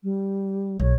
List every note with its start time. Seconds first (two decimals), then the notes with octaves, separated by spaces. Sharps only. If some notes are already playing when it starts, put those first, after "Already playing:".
0.03 G3
0.80 B1 C#5